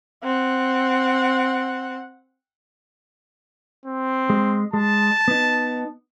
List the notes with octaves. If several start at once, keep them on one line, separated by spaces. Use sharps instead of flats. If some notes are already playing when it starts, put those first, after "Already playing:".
C4 F#5
C4
G#3
G#3 A5
B3 D#4